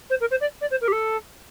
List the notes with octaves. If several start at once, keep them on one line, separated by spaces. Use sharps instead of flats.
C5
A#4
C5
D5
D5
C5
A#4
G4
A4